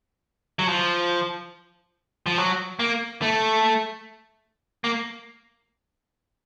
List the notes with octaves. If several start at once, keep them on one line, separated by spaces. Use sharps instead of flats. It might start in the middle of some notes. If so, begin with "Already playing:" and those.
F#3
F3
F3
F#3
A#3
A3
A#3